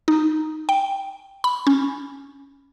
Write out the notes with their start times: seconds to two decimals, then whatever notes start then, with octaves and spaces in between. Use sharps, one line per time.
0.08 D#4
0.69 G5
1.44 B5
1.67 C#4